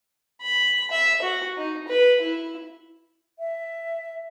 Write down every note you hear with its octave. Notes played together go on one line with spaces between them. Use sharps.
B5
E5
F#4
D#4
B4
E4
E5